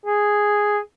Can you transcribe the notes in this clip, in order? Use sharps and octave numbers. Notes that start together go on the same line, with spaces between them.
G#4